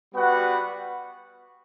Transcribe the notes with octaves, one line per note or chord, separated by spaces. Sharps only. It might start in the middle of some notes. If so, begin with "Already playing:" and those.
G3 B3 F#4 B4 F#5